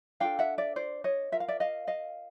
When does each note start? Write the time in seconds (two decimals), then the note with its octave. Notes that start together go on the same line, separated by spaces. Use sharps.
0.20 D4 F4 A4 F5 G5
0.39 E5 F#5
0.58 D5 E5
0.76 C5 D5
1.04 C#5 D#5
1.32 F4 A#4 E5
1.40 F5
1.48 D5 E5
1.60 D#5 F5
1.87 D#5 F5